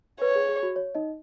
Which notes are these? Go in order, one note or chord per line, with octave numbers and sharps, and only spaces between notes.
B4 C#5
G#4
G#4
F#4
C#5
D#4 D#5